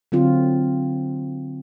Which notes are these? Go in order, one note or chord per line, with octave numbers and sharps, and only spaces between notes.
D3 F#3 C4 F4